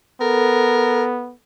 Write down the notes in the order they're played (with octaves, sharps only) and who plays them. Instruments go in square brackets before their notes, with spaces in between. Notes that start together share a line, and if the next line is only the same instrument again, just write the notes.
[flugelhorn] B3 [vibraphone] A4 [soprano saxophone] A#4